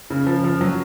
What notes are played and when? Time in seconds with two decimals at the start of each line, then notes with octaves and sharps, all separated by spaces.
0.10 C#3
0.27 F3
0.44 F3
0.61 F#3